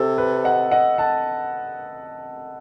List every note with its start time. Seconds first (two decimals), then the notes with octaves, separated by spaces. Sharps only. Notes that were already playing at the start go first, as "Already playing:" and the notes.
Already playing: C3 A4
0.18 B4
0.44 D#5 F#5
0.71 D#5 F#5
0.98 F#5 A5